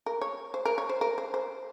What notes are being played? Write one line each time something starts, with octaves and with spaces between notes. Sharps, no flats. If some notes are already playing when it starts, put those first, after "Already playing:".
A#4
C#5
C5
A#4
C#5
C5
A#4
C5
C5